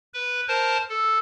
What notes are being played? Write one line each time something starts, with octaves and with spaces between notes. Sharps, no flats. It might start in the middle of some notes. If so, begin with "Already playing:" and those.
B4
A#4 C5 A5
A4